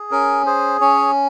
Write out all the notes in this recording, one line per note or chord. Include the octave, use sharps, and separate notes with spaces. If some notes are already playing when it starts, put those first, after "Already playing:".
Already playing: G#4
C#4 A#4
G#4 C5
C#4 C#5